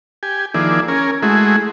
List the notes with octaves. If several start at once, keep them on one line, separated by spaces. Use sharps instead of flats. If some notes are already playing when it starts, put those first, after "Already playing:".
G4 G#5
D#3 F3 A#3 E4 G#4 D5
C#4 A#4 G#5
G#3 A3 E4 F#4 G#4